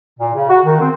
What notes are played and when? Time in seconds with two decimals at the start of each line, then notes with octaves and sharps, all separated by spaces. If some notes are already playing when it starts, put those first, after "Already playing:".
0.19 A#2
0.34 C#3
0.49 F#4
0.64 D#3
0.80 C4